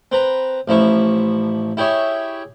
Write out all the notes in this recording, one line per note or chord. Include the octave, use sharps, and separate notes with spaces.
C4 B4 A#5
A1 F3 E4 C#6
E4 G4 G#4 C#5 E5